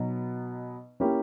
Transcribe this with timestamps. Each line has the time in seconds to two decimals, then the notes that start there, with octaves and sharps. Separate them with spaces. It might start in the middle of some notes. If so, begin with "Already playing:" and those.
Already playing: B2 F#3 B3 D#4
1.00 A#3 C#4 E4 G4